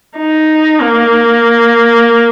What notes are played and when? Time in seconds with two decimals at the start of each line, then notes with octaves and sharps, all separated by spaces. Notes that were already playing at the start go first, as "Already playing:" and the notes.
0.17 D#4
0.82 A#3